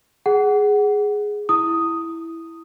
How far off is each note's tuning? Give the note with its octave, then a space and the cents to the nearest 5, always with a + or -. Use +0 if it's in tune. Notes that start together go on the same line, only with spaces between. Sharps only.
G#4 +0 F#5 +15
E4 +0 D#6 +0